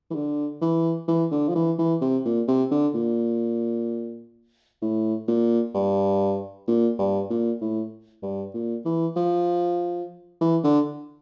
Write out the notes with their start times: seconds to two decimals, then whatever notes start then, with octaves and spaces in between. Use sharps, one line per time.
0.11 E3
0.14 D3
0.61 E3
1.08 E3
1.31 D3
1.49 F3
1.55 E3
1.79 E3
2.01 C3
2.25 A#2
2.48 C3
2.71 D3
2.94 A#2
4.82 A2
5.28 A#2
5.74 G2
6.68 A#2
6.99 G2
7.30 A#2
7.61 A2
8.22 G2
8.54 A#2
8.85 E3
9.16 F3
10.41 E3
10.64 D3